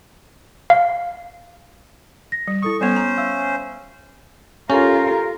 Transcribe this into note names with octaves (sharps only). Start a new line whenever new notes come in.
F5
A#6
G3
E4 A4 C#6 D#6
G3 B3 C#4 C5
A#5
E5 F5 E6
C#4 F4 G4 A4 A#4